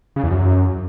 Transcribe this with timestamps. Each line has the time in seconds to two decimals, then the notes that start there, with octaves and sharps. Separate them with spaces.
0.16 C#3
0.23 E2
0.31 F#2